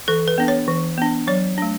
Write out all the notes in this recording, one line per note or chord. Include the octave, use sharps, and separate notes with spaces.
E3 A4
B4
B3 D4
C#5
E3
B3 D4
F#3 C#5
A3 D4